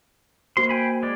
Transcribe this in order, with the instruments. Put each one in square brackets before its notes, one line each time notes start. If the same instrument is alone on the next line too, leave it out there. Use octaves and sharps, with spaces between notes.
[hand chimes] A#3 F#4 C5 [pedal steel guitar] C6
[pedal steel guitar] G5 G#5 B5
G#3 D5